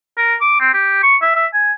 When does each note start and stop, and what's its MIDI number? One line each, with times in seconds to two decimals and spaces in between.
0.18 0.35 70
0.41 0.56 86
0.60 0.72 60
0.74 1.01 67
1.03 1.17 85
1.22 1.33 76
1.36 1.46 76
1.53 1.72 80